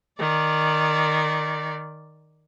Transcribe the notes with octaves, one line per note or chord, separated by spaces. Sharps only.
D#3 D5